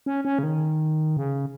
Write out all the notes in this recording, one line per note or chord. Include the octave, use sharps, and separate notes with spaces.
C#4
C#4
C#3
D#3
C#3